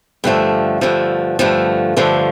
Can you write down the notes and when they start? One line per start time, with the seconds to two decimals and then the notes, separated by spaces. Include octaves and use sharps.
0.24 G2 D3 F3 A3
0.81 G2 D3 F3 A3
1.39 G2 D3 F3 A3
1.97 G2 D3 F3 A3